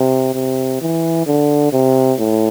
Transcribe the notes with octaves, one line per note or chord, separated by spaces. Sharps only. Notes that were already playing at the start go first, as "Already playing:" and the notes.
Already playing: C3
C3
E3
D3
C3
A2